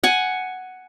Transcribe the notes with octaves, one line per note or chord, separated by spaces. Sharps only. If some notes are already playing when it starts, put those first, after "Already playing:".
F#5 G#5